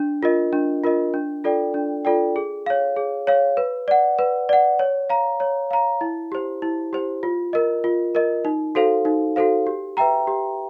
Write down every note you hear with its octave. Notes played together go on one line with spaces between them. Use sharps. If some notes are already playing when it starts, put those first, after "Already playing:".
Already playing: D4
F4 A#4 D#5
D4
F4 A#4 D#5
D4
F4 A4 D5 G5
D4
F4 A4 D5 G5
G#4
C#5 F5
G#4
C#5 F5
B4
D5 F#5
B4
D5 F#5
C#5
F5 A#5
C#5
F5 A#5
E4
G4 C5
E4
G4 C5
F4
A#4 D#5
F4
A#4 D#5
D#4
F#4 A4 C5 F5
D#4
F#4 A4 C5 F5
G4
B4 E5 G5 A#5
G4